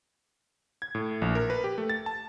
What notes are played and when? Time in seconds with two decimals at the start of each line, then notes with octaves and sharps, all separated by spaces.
0.82 G#6
0.95 A2
1.22 A#1
1.35 A#4
1.50 B4
1.64 G4
1.78 A3
1.89 A6
2.06 A5